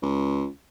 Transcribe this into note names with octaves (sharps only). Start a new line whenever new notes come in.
C#2